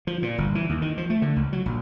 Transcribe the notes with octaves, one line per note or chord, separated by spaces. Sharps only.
F3
A#2
G1
E3
D#2
D#3
F3
A3
D3
C#2
F#3
A#1